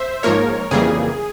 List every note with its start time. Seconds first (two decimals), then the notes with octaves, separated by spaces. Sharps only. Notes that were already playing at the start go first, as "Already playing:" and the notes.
Already playing: C5 E5
0.23 G#2 F3 A#3 A#4 C#5
0.71 F2 C#3 E3 G3 A#3 G#4